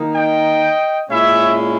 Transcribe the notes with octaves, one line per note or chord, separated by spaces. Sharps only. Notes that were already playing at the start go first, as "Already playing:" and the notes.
Already playing: D#3 A#3 D#4
D#5 G5
A#2 G#3 C#4 E4 C#5 E5